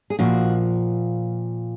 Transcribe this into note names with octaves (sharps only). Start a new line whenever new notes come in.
G#4
A#2 F3 F#4